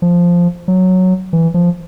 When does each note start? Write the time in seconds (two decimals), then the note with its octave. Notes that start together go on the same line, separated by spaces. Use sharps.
0.02 F3
0.68 F#3
1.33 E3
1.54 F3